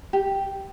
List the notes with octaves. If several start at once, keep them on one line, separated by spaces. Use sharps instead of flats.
G4